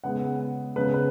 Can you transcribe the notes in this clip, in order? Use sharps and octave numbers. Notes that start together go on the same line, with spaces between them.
C#3 G#3 B3 F#5
C#3 G#3 B3 B4
B4